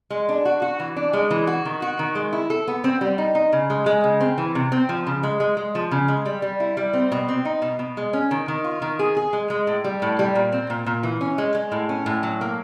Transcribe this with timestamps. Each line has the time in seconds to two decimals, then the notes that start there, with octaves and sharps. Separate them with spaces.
0.10 G#3
0.29 D4
0.45 F#4
0.62 F#4
0.80 E3
0.96 D4
1.13 G#3
1.31 E3
1.47 F#4
1.65 D#3
1.82 F#4
1.99 D#3
2.15 G#3
2.33 E4
2.50 A4
2.68 B3
2.84 C4
3.01 G3
3.18 D#4
3.35 D#4
3.53 C#3
3.70 G#3
3.86 G#3
4.04 C#3
4.20 C4
4.38 E3
4.55 C3
4.72 C4
4.89 F3
5.07 C#3
5.23 G#3
5.40 G#3
5.57 G#3
5.75 F3
5.91 C#3
6.08 G#3
6.26 G3
6.42 G3
6.60 E4
6.77 G3
6.93 C4
7.12 B2
7.29 C4
7.45 D#4
7.62 B2
7.79 B2
7.97 G#3
8.13 C#4
8.31 D#3
8.48 D#3
8.64 F4
8.82 D#3
8.99 G#4
9.17 G#4
9.33 G#3
9.50 G#3
9.67 A2
9.84 G3
10.02 A2
10.19 G3
10.35 A#2
10.52 C4
10.70 A#2
10.86 A#2
11.03 E3
11.21 C#4
11.38 G#3
11.55 G#3
11.72 A2
11.89 C#4
12.06 A2
12.23 F#3
12.41 A#3